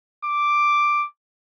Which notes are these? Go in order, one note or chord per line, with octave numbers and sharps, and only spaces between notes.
D6